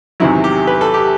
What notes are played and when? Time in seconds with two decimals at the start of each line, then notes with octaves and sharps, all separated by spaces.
0.20 E2 C3 D#3 F#3 E4
0.44 G4
0.67 B4
0.81 A4
0.94 G4